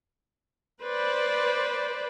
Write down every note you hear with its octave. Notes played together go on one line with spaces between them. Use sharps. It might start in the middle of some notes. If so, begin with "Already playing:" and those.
B4 C5 D5